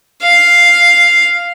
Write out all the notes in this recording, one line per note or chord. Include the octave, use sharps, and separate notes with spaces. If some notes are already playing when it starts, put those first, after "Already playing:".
F5